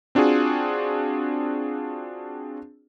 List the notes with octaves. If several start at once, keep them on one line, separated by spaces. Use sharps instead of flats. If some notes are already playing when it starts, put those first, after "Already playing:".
C4 D4 F4 F#4 G#4